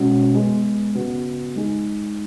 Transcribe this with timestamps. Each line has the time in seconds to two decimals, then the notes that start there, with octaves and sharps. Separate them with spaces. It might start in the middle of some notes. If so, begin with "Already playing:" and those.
Already playing: B2 G#3 C#4 F#4
0.34 G#3 B3 G#4
0.95 C#3 B3 F#4
1.56 G#3 D#4 G#4